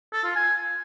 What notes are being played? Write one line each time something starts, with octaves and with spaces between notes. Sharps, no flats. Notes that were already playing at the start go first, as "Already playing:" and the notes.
A4
F4
G#5